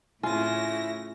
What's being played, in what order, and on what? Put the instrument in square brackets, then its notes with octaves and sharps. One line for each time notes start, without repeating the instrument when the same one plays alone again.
[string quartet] A2 C#3 A#6 [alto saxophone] E4 [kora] F4 [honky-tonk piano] G#5